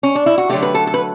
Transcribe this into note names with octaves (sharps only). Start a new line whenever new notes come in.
C#4
D4
E4
F#4
D3 F#3 A3 G4
B4
A4
A4
B4